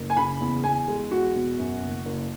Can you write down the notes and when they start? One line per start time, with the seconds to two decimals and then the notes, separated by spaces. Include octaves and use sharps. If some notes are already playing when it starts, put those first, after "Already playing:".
Already playing: F#1
0.10 G#5
0.17 C#3 B5
0.40 E2
0.64 E2 G#5
0.88 G#3
1.11 E2 F#4
1.35 B2
1.58 F#2
1.81 F#1
2.05 F#1